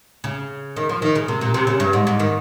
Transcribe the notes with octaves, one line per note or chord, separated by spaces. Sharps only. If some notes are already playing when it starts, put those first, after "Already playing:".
C#3
D#3
F3
D#3
C#3
C3
A#2
C3
C#3
G2
G#2
G#2
D#3